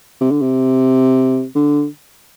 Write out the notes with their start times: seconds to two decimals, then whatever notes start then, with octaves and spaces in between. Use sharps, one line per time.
0.21 C3
0.31 D3
0.41 C3
1.55 D3